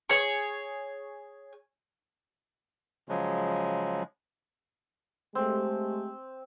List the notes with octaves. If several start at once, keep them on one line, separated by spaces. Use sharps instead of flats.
G#4 C#5 C#6
C#3 F3 F#3 G#3
G#3 A3 C4 G4